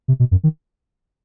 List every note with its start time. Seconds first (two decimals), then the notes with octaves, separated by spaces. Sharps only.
0.08 C3
0.20 B2
0.31 F#2
0.44 D#3